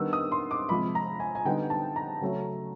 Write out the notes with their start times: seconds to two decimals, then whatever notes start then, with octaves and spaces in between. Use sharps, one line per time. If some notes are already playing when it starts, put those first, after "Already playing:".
Already playing: D#3 G3 B3 D4 E6
0.13 D#6
0.32 C6
0.51 D6
0.69 C3 F3 G#3 B5
0.95 A#5
1.20 G#5
1.35 G#5
1.45 D3 G3 B3 D#4 G5
1.70 A5
1.96 A#5
2.21 C#3 F#3 A3 C#4